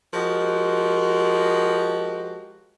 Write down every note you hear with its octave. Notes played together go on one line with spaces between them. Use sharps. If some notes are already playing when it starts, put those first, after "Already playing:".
F3 G#3 F#4 G4 A#4